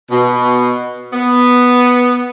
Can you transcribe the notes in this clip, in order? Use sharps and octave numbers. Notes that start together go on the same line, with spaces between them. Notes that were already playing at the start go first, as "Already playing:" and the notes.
B2
B3